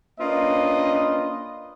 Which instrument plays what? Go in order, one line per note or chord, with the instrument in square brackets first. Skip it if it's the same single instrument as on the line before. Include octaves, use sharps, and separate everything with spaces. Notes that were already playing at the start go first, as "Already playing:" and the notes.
[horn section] A#3 C#4 D4 F4 B4 D#5